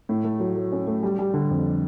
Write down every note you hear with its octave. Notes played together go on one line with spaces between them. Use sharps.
A2
A3
F#3
F#3
C#4
A3
G3
G3
D3
F2